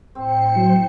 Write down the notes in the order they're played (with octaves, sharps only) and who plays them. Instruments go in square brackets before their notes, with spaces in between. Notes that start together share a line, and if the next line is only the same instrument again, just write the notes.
[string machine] A2 C5 C#7 [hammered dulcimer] C4
[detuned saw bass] F#3